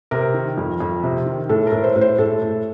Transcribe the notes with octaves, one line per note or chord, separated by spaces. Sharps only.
C3 A#4
D#3
F2
F2
C3
D#3
A2 A4
A#4
A2
C5
A2
C5
A2 A4
A2